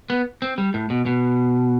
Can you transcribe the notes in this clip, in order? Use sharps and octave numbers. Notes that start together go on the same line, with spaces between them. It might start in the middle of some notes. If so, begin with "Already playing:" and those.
B3
C4
G3
A2
B2
B2